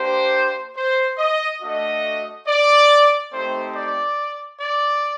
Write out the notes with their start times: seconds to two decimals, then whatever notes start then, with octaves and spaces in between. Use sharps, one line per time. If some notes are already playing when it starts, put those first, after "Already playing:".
Already playing: A#3 D4 G4 C5
0.76 C5
1.18 D#5
1.61 A3 D4 F#4 D#5
2.47 D5
3.32 A3 C4 D#4 G4 C5
3.75 D5
4.60 D5